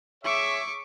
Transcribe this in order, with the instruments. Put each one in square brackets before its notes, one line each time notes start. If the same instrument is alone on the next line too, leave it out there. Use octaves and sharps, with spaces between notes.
[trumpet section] G#4 C#5 E5 [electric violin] C#6 D6